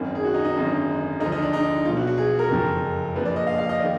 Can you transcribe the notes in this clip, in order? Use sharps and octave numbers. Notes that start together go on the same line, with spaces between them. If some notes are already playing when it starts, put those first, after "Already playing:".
Already playing: G#1 F#2 D#3
G#4
F#4
D#4
D#4
G#1 F#2 D3
D2 D3 F3 D#4
D#4
D4
D#4
B1 B2 F4
F#4
F#4
G#4
A#4
F#1 F2 F3
A#1 A#2 F3 B4
D5
D#5
F5
F5
D#5
D#3 D5